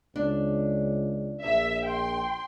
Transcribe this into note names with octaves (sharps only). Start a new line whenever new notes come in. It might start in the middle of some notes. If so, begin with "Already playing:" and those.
C#2 D4
A#1 E5
G5 C6